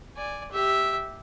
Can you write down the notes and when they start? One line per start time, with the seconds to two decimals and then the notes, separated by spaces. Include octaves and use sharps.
0.16 D5 G#5
0.51 G4 E5